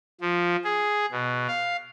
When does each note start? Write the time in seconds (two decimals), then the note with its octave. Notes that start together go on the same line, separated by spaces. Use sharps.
0.21 F3
0.64 G#4
1.12 B2
1.48 F5